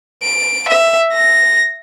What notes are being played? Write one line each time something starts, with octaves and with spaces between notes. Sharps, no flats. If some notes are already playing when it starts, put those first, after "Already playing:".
D7
E5
A#6